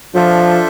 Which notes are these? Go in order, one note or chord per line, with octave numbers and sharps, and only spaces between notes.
F3 D4 F4 A4 C5 E5